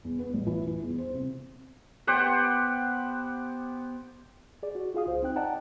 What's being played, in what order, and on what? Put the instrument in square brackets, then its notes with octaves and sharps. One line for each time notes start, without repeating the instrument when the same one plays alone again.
[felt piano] E2
B3
A1
E3
E3
E2
C5
C3
[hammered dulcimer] B3 G4 C5 F#5
[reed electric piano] G#4 D5
F#4
F4 G#4 F5 D#6
C#2 C5
C4 D#4 G5 F#6
D5 D#5 F#5 G5 A5 A#5